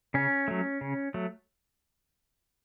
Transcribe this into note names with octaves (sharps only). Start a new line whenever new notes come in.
C#3 C#4
F#3 A3
C#3
F#3 A3